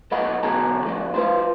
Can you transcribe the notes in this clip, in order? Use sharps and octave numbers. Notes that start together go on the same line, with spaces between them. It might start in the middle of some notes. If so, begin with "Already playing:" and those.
B1 A2 A4 D#5 F#5 B5
B1 B2 D3 G#4 A4 A#5
F2 A2 D4
F4 B4 C5